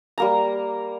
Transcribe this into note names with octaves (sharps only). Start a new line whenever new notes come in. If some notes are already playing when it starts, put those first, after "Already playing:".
G3 A#3 A#5